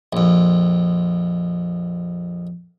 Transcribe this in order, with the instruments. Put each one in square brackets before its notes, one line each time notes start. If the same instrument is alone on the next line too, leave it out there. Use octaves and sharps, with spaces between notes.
[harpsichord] A#1 F2